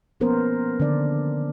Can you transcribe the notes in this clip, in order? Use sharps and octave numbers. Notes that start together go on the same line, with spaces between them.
F3 A#3 B3 C#4 A#4 C5
D3 D#3 D4 D5